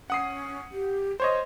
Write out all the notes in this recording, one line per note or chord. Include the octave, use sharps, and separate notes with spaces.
C#4 F#5 D#6 C7
G4
C5 C#5 D#5 C6